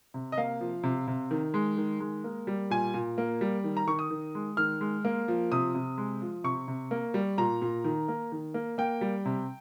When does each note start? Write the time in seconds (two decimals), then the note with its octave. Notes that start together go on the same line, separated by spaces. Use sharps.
0.14 C3
0.32 D#5
0.37 A#3 F5
0.61 F3
0.83 C3
1.08 C3
1.31 D#3
1.54 G#3
1.77 D#3
2.00 G#3
2.24 A#3
2.47 G3
2.70 A#2 G#5
2.94 A#2
3.18 A#3
3.41 G3
3.64 D#3
3.77 A#5
3.87 D#3 C#6
3.99 D#6
4.10 D#3
4.35 G#3
4.57 D#3 F6
4.81 G#3
5.05 A#3
5.28 F3
5.52 C3 D#6
5.75 C3
5.98 G#3
6.22 F3
6.44 C3 C#6
6.68 C3
6.91 A#3
7.14 G3
7.38 A#2 A#5
7.62 A#2
7.84 D#3
8.08 A#3
8.32 D#3
8.54 A#3
8.78 A#3 G5
9.01 G3
9.25 C3